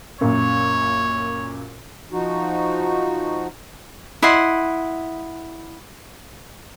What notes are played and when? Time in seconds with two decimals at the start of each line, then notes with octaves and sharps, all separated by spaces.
0.21 F#2 A#2 C#5
2.12 F3 D#4 F#4
4.22 E4 D#5 F#5 C6